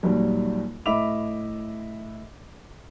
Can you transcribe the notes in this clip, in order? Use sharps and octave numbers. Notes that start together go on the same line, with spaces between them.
A#1 D#2 F#3 G3
A2 D#5 E5 B5 D6 F7